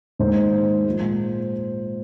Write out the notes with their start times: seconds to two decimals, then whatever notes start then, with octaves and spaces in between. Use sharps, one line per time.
0.19 G#2 D#3 A#3 C5
0.86 A#2 F3 G#3